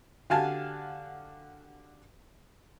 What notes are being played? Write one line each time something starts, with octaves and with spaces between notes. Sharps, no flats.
D3 F#4 G4 F5 G#5 A5